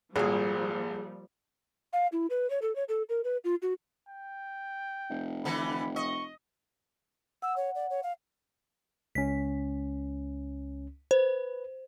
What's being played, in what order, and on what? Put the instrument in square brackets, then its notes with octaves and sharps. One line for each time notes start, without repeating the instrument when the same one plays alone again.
[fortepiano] G#1 A#2 [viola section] F3 G3 A#3 [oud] G#4 F5
[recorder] F5
E4
B4
C#5
A4
C#5
A4
A#4
B4
F4
F#4
[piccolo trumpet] G5
[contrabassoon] F1
[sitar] D3 E3 [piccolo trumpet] B5
[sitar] D#5 [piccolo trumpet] C#6
[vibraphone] F#5 [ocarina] E6
[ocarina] C#5
D5
C#5
F5
[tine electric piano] C#2 C#4 [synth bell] B6
[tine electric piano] B4 [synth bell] C5